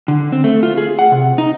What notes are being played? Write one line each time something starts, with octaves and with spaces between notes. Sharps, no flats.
D3
C4
A3
F4
G#4
F#5
C3
D#4